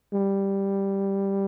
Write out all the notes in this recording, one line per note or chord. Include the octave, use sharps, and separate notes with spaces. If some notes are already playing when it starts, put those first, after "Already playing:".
G3